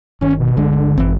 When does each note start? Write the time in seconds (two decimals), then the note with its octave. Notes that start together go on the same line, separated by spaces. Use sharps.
0.21 G1 D#3 C#4
0.40 B2
0.57 G1 D2 D3 G#3
0.98 G#1 F#2 E3 C4